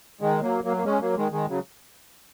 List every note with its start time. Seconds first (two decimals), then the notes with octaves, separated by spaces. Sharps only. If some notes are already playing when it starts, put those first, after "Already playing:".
0.21 D#3 G#3
0.42 F#3 A#3
0.64 F#3 A#3
0.77 A#3
0.84 G#3 C#4
1.01 F#3 A#3
1.16 D#3 G#3
1.32 D#3 G#3
1.48 C#3 F#3